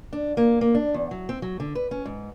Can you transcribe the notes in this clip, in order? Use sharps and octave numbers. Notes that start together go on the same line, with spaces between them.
D4
A#3
A#3
D4
E2
F#3
C4
F#3
D3
B4
C#4
G#2